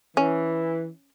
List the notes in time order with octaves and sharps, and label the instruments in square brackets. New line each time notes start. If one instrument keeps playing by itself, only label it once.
[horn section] E3 [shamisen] C#4